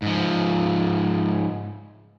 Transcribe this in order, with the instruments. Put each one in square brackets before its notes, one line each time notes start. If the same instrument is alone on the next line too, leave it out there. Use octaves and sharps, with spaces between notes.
[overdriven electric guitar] G#2 F3